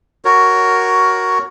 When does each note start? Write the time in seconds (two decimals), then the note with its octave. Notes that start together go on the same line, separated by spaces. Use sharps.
0.25 F#4 A#4 C#5